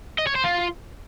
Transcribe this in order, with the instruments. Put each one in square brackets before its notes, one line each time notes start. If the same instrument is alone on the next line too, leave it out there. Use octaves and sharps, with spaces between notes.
[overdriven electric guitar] D#5
C#5
C5
F4